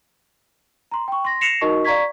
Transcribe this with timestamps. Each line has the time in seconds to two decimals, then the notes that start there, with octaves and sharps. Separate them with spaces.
0.91 A#5 C6
1.08 G5 C#6
1.25 C6 A#6
1.41 A#6 C7 C#7 E7 F7
1.61 D#4 F#4 A#4 D#5 A5 C#6
1.85 D5 F5 A#5 C#6 G#6 B6